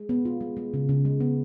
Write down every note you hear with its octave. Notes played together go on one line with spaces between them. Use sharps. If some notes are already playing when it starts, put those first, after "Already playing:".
Already playing: G#3
B3
F4
G#3
G#3
C#3
C#3
G#3
B3